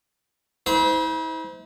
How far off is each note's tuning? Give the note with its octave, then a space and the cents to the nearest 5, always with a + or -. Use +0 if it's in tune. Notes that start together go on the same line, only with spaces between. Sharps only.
E4 -40 C5 -25